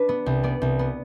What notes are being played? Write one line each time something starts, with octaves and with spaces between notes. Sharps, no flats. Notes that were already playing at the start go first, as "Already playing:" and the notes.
Already playing: D4 B4
B3
C2
B3 D5
C2
B3